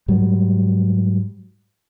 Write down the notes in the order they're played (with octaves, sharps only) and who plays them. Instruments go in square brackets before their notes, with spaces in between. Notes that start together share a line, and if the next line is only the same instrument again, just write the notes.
[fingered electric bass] G#2 F#3 G3